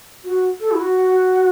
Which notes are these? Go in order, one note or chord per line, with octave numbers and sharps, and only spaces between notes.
F#4
A4
E4
F#4